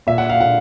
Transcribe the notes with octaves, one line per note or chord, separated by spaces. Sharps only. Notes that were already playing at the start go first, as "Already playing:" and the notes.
A#2 E5
F#5
F5
A#2 F#5